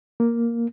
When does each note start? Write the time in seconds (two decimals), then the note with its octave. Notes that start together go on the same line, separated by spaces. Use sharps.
0.20 A#3